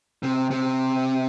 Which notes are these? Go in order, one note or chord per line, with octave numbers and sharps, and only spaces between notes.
C3
C3